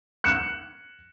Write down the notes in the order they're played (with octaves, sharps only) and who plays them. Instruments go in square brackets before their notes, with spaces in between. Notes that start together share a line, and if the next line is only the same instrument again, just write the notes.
[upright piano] F#6 C#7 E7